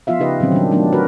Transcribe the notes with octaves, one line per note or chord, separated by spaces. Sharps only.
F3 B3 F4 E5 F5
C#3 D#4 G4 B4 D#5
A#2 D3 F3 F#3 C4 C#4
D#3 F#3 G3 D4
F#3 A3 B3 D4 D#4
F#4 A#4 B4